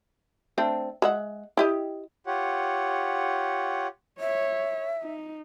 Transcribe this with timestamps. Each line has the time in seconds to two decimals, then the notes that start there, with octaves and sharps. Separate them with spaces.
0.58 A3 C4 D4
1.02 G#3 E5 F#5
1.57 E4 G4 D#5
2.27 F4 G4 C#5 F#5
4.20 C#5 E5
5.02 D#4